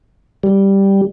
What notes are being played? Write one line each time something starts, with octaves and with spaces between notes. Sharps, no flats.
G3